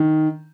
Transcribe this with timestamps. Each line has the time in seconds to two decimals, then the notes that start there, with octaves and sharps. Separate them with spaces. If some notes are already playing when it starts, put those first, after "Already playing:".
Already playing: D#3